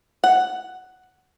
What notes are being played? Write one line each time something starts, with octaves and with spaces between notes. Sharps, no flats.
F#5